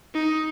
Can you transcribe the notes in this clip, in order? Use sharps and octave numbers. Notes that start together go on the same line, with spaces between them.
D#4